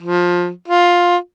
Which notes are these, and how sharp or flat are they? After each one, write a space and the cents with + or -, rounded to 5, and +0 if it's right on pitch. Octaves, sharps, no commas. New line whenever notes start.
F3 +15
F4 +10